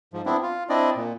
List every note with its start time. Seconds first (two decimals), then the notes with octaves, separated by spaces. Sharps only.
0.13 G#2 F3
0.26 B3 C4 D4 E4
0.42 F4
0.69 C4 D4 E4 D5 D#5
0.97 A#2